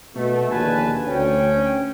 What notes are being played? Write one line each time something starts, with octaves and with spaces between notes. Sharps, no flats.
B2 A3
A#1 D#2 D3 B4 G#5 A5
D2 C#4 G5